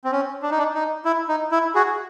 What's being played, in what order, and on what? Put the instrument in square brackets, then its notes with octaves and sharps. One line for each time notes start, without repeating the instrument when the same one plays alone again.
[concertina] C4
C#4
D4
D#4
D4
D#4
E4
D#4
E4
F#4 G#4